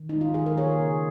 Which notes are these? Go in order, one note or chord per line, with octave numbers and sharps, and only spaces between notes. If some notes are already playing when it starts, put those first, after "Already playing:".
Already playing: D#3
D#4
G#3
F4
D#3 G#4
A#4
A#3 G#4 C#5
C#3